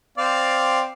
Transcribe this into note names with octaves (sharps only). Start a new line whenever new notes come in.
C4 D5 F5